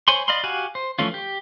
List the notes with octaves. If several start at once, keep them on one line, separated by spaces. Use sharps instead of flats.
C5 C#5 G#5 B5 C6
D5 D#5 F5 B5 C6
F#4 G4 F5 F#5 G#5
C5
E3 F3 A3 C#4 F4
G4